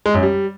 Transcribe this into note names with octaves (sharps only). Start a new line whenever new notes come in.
G#3
F#2
G3